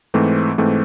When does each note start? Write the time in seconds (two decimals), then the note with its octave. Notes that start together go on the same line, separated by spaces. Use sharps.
0.14 G#2 E3 A3 C4
0.58 G#2 E3 A3 C4